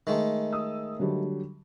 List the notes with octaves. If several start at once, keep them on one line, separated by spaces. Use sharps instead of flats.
D#3 G#3 A3
D#6 E6
D3 F#3 G3